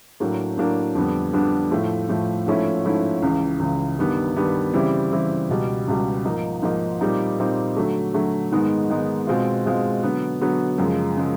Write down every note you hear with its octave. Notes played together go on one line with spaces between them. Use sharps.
A2 F#3 A#3 D4
A2 F#3 A#3 D4
F2 D3 G3 B3 D4
F2 D3 G3 B3 D4
A2 F3 A3
A2 F3 A3
G#2 F3 A3 C#4 E4
G#2 F3 A3 C#4 E4
C#2 C#3 E3
C#2 C#3 E3
G2 D#3 G3 B3
G2 D#3 G3 B3
C#3 E3 G3 C4 E4
C#3 E3 G3 C4 E4
C#2 B2 G3
C#2 B2 G3
G#2 F3 A#3 D#4
G#2 F3 A#3 D#4
A#2 G3 C4 D#4
A#2 G3 C4 D#4
D3 F#3 A3
D3 F#3 A3
G#2 D#3 G#3 B3 D#4
G#2 D#3 G#3 B3 D#4
B2 G#3 C4 F4
B2 G#3 C4 F4
D3 F#3 B3
D3 F#3 B3
F#2 C#3 F3 G#3
C#3 F3 G#3